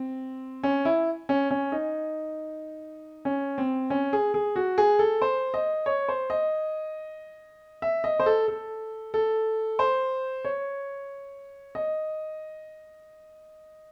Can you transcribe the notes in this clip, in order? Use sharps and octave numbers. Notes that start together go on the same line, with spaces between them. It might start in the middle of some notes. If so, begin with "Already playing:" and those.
Already playing: C4
C#4
E4
C#4
C#4
D#4
C#4
C4
C#4
G#4
G#4
F#4
G#4
A4
C5
D#5
C#5
C5
D#5
E5
D#5
C5
A4
A4
A4
C5
C#5
D#5